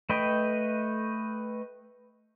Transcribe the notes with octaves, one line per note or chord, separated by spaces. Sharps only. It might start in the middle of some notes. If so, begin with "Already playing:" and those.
A3 B4 D#5 G5